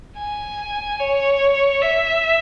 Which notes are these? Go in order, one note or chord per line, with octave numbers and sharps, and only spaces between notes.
G#5
C#5
E5